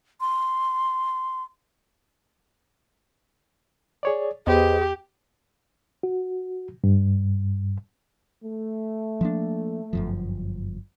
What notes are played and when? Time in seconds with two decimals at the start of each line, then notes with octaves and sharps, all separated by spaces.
0.21 C6
4.03 G#4 C#5 D5
4.47 E2 G4 G#4 B4 C5 D#5
6.03 F#4
6.84 G2
8.44 A3
9.21 F3 A#3 D4
9.93 G1 F#2 F3